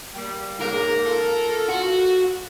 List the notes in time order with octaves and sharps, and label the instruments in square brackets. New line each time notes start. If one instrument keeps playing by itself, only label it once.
[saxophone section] G3 A#3
[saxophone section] G#2 C#3 A#3 [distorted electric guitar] A#4
[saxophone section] F4 A4
[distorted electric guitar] F#4